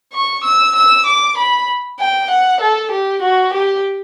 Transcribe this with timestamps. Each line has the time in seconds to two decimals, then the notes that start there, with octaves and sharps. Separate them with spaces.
0.13 C#6
0.44 E6
0.76 E6
1.06 D6
1.38 B5
1.99 G5
2.30 F#5
2.61 A4
2.91 G4
3.22 F#4
3.53 G4